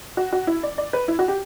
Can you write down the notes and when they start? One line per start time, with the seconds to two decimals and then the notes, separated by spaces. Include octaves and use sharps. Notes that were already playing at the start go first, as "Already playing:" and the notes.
0.17 F#4
0.33 F#4
0.47 E4
0.63 D5
0.78 D5
0.93 B4
1.08 E4
1.19 F#4
1.28 G4